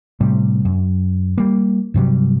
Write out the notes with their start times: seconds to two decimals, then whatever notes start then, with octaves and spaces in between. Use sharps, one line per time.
0.21 A2 C3 G3
0.65 F#2
1.38 G3 A#3
1.94 G2 C3 F#3 G3